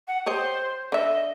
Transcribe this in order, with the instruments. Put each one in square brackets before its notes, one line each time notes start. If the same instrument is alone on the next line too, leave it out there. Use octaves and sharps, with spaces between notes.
[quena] F#5
[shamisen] G4 C#5 D#5 [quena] C5
[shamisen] D3 E5 [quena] D#5